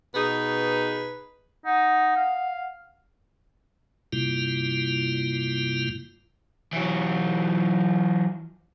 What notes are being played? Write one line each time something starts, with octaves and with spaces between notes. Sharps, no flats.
B2 D#4 G#4 B4
D#4 F#5
F5
G2 C3 G3 A#3 E4 F4
E3 F#3